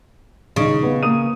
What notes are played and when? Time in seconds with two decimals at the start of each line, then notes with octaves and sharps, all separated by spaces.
0.56 D#1 C#3 D#4
0.83 B3
1.03 A#3 D#6 D#7